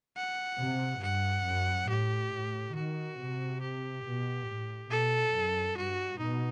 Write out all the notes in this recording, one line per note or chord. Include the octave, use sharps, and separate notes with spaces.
F#5
C3
G2 F#5
F#2
A2 G4
A2
D#3 F#4
C3
G4
B2
A2
B2 A4
F#2
G2 F#4
B2 D#4